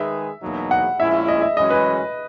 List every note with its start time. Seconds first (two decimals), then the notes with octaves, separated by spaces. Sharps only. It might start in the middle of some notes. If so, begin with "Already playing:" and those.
Already playing: D#3 G#3 D#4 G#4 B4 E5
0.42 E2 B2 F#3 A#3 D#4
0.71 F#5
0.99 A#1 A#2 G#3 C#4 E4 E5
1.28 D#5
1.42 E5
1.56 F#2 E3 G#3 C#4 F#4 D#5
1.71 B4